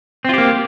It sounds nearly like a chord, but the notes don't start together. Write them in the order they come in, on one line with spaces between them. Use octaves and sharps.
C4 F4 G4 A#3